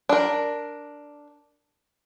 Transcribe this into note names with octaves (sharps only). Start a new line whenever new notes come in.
D4 A#4